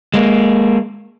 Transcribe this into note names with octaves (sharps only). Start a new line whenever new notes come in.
G#3 A#3